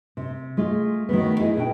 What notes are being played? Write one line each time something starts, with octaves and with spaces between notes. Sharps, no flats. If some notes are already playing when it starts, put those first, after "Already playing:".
C3
G#3 A3 F4
D#3 F#3 A3 B3
E4 G#4 D#5
B2 D4 D#4 G5